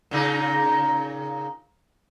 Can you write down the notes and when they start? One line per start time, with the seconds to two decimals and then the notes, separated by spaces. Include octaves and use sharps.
0.11 A#2 C#3 D#4